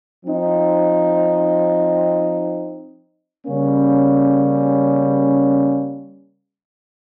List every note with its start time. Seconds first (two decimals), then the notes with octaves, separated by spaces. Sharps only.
0.25 F3 C4 D#4
3.46 C#3 G3 A#3 C#4